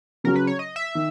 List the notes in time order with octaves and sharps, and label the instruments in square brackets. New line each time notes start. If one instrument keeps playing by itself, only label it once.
[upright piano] C#3 F#3 C#4 F#4 [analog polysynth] A#4
[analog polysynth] B4
C#5
D#5
E5
[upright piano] D#3